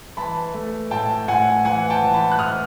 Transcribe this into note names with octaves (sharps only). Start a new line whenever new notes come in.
E3 A5 B5
A3
A2 G5 A5
A2 F#5 G#5
E3 F#5 G#5
G5 A5
E3
A5 B5
F#6
E3 D#6 F6